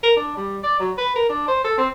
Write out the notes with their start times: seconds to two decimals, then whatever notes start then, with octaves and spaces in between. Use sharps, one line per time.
0.03 A#4
0.16 D4
0.37 G3
0.63 D5
0.79 F#3
0.98 B4
1.15 A#4
1.29 D4
1.48 C5
1.64 A4
1.78 C4